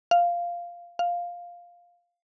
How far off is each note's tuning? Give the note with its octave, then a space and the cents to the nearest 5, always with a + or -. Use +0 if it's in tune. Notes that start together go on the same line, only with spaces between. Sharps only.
F5 -5
F5 +5